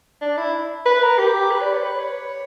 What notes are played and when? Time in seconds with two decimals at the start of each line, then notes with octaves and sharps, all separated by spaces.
0.21 D4
0.37 E4
0.86 B4
1.02 A#4
1.18 G4
1.51 B4
1.61 D5
1.72 C#5
1.83 B4
1.99 C#5